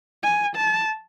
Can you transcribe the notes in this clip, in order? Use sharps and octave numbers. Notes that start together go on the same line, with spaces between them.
G#5
A5